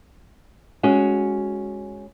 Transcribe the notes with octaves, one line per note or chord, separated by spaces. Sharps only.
G#3 C#4 F#4